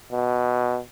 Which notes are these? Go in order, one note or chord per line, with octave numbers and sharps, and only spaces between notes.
B2